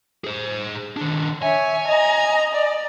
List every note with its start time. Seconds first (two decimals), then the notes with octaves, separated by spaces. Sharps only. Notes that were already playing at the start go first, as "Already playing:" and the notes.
0.24 G#4 C5
0.97 D#3 D4
1.42 C#5 E5 G#5
1.87 D#5 A#5
2.54 D5